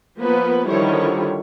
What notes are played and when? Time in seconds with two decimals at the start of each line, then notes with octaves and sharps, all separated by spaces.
0.20 F3 A#3 B3 B4
0.69 D3 D#3 F3 G3 E4 C#5